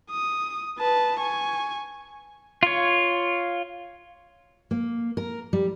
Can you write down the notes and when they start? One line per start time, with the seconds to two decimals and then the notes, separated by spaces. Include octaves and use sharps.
0.11 D#6
0.78 B4 A5
1.19 G#5 C#6
2.63 F4 C#5
4.71 A#3
5.17 A#4
5.53 G3